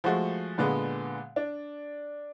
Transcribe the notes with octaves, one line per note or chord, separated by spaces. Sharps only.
F3 G#3 A3 F#4
A#2 D3 G#3 B3
D4